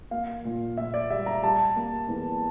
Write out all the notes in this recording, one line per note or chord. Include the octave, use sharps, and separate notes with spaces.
A#3 F5
A#2
A#2 E5
D5
G3 E5
A#5
G3 A5
A#3
E2